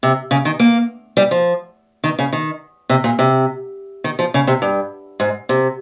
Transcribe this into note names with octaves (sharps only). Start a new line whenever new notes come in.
C3
C#3
D#3
A#3
G3
F3
D#3
C#3
D#3
C3
A#2
C3
D#3
F3
C#3
C3
G2
G#2
C3